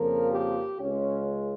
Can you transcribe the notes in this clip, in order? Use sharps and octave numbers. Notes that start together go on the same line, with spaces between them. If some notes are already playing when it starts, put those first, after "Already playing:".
Already playing: F2 C#3 F3 A#3 A#4
G4
C#2 C#3 G#3 C#4